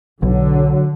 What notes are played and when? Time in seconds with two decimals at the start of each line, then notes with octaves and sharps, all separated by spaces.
0.23 B1 D3 F#3